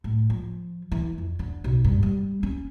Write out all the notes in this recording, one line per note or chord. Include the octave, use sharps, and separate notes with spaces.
A2
F3
E3
F2
D3
B1
G2
G3
C#4